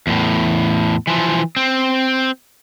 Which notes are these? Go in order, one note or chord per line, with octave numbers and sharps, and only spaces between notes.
E2 A2
E3 F3
C4